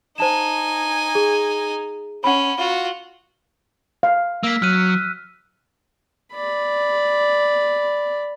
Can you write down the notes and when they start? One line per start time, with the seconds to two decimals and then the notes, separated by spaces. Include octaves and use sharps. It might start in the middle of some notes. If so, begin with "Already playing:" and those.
0.18 D#4 C5 G#5 A5 E7
1.15 G#4
2.24 C#4 F#5 B5
2.57 F4 F#4
4.03 F5
4.43 A#3 E6 B6
4.62 F#3 F6 F#6 D#7
6.34 D5 B5